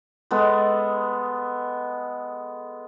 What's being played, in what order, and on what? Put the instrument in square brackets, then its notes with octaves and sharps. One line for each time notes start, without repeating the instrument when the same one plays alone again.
[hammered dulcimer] G#3 B3 A4